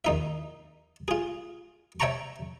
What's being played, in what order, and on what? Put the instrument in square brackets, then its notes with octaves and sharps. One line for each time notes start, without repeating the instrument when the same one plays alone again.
[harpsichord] D#2 D#4 E5
F4 G#4
C#5 E5 G5 A5 A#5 C#6